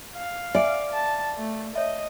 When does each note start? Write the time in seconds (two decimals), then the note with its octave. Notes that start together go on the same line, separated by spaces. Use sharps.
0.16 F5
0.55 D5 E5 G#5
0.93 A5
1.38 A3
1.76 C#5 D#5 E5